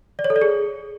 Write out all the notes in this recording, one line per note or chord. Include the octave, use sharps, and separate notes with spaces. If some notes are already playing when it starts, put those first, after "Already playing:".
D5
C#5
A4
D5
G#4